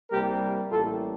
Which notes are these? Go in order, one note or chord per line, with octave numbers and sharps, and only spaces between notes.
C2 C3 G3 A#3 G4 A#4
A1 A2 G3 A#3 F4 A4